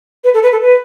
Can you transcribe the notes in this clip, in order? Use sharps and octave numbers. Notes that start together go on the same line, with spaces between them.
B4
A4
B4
A4
B4